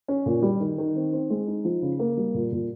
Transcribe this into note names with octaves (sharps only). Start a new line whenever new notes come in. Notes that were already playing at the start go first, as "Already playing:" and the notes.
C#4
A#2
G3
D#3
D#3
C4
C4
G#3
D#4
F3
C#3
A#3
G3
A#2
A#2